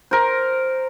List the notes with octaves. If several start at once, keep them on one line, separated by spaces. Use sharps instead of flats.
A#4 C5